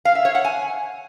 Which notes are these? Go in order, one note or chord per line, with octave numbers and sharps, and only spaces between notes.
F5
E5
C#5
F#5
G#5